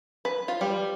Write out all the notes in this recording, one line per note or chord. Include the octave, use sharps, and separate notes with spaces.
B4
F4
G3